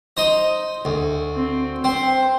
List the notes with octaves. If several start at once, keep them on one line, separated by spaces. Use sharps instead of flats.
D#4 C5 D#5
D2
C4
C4 C5